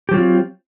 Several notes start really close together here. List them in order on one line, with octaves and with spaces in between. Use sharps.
G4 F#3 F4 C4